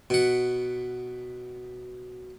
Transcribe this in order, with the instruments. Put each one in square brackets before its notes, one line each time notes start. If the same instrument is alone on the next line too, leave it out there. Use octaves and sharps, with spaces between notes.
[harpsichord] B2 F#5